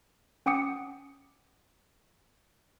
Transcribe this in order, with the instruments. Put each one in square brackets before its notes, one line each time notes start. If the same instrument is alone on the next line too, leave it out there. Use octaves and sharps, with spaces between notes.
[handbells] C#4 F#5 G5 D6 D#6 C#7